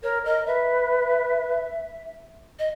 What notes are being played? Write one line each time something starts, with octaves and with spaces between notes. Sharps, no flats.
A#4 C#5
A#4 D#5
B4 E5
D#5